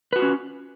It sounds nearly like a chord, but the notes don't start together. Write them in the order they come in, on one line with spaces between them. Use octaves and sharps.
B4 F#4 F4 C#4